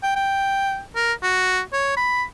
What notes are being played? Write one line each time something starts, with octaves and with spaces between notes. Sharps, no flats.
G5
G5
A#4
F#4
C#5
B5